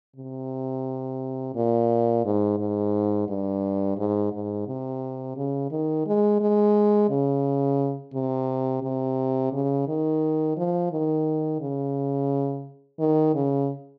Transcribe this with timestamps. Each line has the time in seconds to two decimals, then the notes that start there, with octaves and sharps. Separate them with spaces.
0.16 C3
1.55 A#2
2.25 G#2
2.59 G#2
3.28 G2
3.97 G#2
4.32 G#2
4.67 C3
5.36 C#3
5.71 D#3
6.06 G#3
6.41 G#3
7.10 C#3
8.14 C3
8.83 C3
9.53 C#3
9.88 D#3
10.57 F3
10.91 D#3
11.60 C#3
13.00 D#3
13.35 C#3